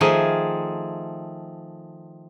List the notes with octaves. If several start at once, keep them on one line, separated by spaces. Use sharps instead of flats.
D#3 F3 A3 G#4